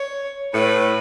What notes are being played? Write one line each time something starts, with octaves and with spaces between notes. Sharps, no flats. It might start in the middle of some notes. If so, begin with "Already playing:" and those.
Already playing: C#5
A2 B4